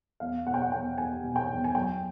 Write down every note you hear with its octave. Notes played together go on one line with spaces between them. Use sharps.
E2 F5
B2 F#5
G5
F#5
E2 G5
E2 G#5
B2
G5
E2
G#5
F#3 G5